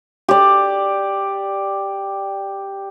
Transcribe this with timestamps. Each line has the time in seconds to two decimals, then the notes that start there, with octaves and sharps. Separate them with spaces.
0.28 G4 D5